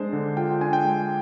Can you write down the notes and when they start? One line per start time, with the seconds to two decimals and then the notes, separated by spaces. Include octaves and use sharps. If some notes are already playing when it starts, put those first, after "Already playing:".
Already playing: G#3 D4 C5
0.13 D3
0.37 F4 G5
0.61 D4 G#5
0.73 G5
0.85 G#3